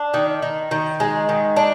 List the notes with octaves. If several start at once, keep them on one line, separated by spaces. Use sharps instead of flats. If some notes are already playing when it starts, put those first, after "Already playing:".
Already playing: D4
D#3
D#3
D#3
G#3
D#3
D4